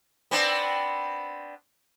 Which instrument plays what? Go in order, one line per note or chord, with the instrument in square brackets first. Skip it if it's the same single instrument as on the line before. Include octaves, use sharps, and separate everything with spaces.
[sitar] B3 C4 D4